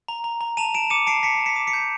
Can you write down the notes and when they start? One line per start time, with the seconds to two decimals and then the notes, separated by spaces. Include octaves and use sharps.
0.08 A#5
0.24 A#5
0.41 A#5
0.57 A5 D#7 F7
0.74 A5 D7 E7
0.90 D6 C#7 D#7
1.07 A5 C7 D7
1.23 A5 B6 C#7
1.41 A5
1.46 B6 C#7
1.56 D6
1.67 B6 C#7
1.73 G6